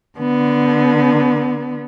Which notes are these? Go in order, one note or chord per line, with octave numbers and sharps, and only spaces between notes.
D3 B3